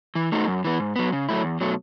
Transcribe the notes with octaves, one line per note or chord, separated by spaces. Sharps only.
E3
A3 D#4 F#4
F#2
E3 B3
G#2
F#3 B3
C#3
F#3 A3 E4
E2
B2 F#3 A3